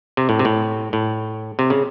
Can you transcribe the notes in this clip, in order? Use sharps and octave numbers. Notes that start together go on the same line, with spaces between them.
C3
A2
C3
A2
A2
C3
C#3